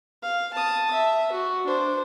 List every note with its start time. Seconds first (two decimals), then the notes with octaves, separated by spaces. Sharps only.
0.23 F5
0.54 A5 D#6
0.93 E5
1.32 F#4
1.66 D4 C5